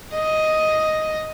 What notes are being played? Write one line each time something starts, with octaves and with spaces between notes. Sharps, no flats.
D#5